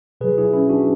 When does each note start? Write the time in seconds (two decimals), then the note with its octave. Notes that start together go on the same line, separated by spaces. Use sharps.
0.21 B2 F#3 G#4 B4
0.38 E4 G#4
0.53 C#4 E4
0.69 D4 F#4